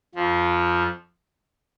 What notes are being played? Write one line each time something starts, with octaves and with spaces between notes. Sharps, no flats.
F2 F3